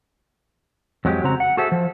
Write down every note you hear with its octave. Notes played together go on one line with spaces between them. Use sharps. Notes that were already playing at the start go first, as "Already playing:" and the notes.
F2 F#3 G#3 G4
C#3 C4 F#4 A#5
F#5
F#4 G#4 A4 C5 E5
F3